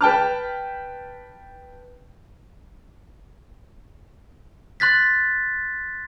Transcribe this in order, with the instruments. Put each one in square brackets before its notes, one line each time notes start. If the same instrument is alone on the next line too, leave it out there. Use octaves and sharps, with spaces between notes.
[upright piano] B4 G5 A5 F6
[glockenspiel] C6 F#6 A6 B6